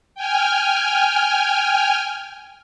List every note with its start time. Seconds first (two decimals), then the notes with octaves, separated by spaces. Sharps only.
0.15 G5 G#5 F6